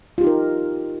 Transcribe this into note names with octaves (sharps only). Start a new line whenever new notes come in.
D#4 F4 G4 A#4